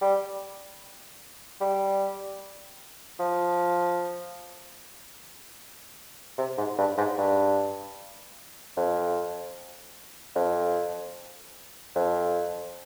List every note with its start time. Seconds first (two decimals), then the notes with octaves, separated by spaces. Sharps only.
0.01 G3
1.61 G3
3.20 F3
6.38 C3
6.58 G#2
6.78 G2
6.98 G#2
7.18 G2
8.77 F2
10.36 F2
11.96 F2